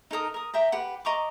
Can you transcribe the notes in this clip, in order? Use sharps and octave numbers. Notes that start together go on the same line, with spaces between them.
D#4 A4 A#4 D#6
A#4 D#6
G4 E5 G5 A#5
G4 B4 F#5
D#5 A#5 C#6 D6